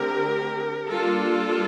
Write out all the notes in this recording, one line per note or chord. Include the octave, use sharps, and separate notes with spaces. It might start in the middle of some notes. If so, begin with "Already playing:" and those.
Already playing: D3 A3 C4 G4 A#4
G3 A#3 D4 F4 A4